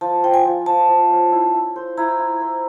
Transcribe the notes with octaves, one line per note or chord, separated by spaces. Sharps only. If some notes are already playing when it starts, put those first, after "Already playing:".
F3 A5
F3 G5
G#5
F3
F3 A5
F3
C#4
E4
E4
C5
E4 A#5
E4
C5